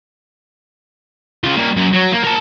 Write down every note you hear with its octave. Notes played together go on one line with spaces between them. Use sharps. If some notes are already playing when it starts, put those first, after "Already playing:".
C#3 F4
G3 A#3
F#2
F#3
A#3
A#4 A5